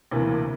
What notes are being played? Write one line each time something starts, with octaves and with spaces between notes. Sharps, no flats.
D2 C3 E3 A#3